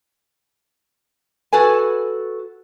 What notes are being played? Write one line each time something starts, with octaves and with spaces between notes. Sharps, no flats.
F#4 A4 B4 G#5